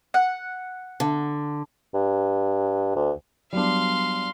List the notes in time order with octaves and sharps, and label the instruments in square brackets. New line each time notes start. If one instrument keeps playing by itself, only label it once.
[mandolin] F#5
[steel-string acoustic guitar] D3
[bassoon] G2
D2
[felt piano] F#3 B3 [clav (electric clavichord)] G3 D4 [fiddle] F5 C6